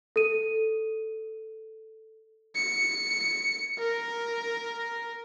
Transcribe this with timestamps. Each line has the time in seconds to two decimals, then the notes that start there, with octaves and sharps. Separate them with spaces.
0.16 A4 D#7
2.56 C#7
3.78 A#4